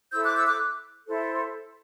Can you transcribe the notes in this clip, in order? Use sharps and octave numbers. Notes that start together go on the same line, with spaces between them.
E4 A4 C5 E6 G6
D6 F#6
E6 G6
D6 F#6
E4 A4 C5